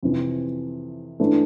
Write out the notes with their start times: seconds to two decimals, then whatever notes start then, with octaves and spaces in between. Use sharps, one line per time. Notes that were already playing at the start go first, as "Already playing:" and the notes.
0.03 F2 C3 E3
1.20 E3 A3 D4